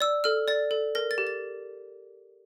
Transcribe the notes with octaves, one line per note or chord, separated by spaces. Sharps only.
D5 E6
A4 F6
D5 A6
A4
A#4 A#6
A6
G4
A6